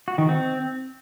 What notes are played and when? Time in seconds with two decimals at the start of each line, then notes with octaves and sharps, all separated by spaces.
0.08 F#4
0.18 D#3
0.29 C4